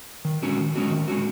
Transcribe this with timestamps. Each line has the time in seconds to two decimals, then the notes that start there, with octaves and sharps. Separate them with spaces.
0.25 D#3
0.42 G#3 C#4 F#4
0.59 D#3
0.75 G#3 C#4 F#4
0.91 D#3
1.08 G#3 C#4 F#4